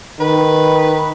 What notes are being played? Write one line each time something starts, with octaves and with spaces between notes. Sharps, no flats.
D#3 B4